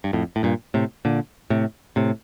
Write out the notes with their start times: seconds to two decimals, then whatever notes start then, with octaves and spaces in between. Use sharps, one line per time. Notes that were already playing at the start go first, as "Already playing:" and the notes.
0.04 G2
0.13 F2 A2
0.36 A2
0.43 G2 A#2
0.74 A2 C3
1.05 A#2 D3
1.50 A2 C3
1.96 A2 C3